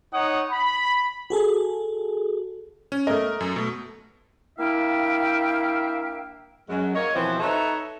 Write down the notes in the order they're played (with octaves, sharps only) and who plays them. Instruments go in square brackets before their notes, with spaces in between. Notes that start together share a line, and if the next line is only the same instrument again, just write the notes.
[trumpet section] D#4 C#5 F#5 D#6
B5
[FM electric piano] F#4 G#4 A4
[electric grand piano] C#4
[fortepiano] A3 D#5 [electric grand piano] A#4
[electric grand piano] F#2
B2 A3
[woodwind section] A#3 D4 E4 E5 F5 G5
[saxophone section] F#2 F#3 G#3
A#3 C#5 D#5
B2 E3 F3 C4 B4 E5
D#4 A4 B4 C#5 D#5 E5